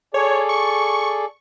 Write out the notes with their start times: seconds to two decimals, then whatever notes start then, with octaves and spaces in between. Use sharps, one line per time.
0.14 G#4 A4 C#5 D5
0.49 C#6